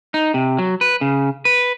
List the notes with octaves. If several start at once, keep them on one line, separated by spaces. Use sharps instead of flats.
D#4
C3
F#3
B4
C#3
B4